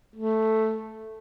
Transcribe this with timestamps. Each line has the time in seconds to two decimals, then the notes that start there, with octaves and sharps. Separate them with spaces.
0.16 A3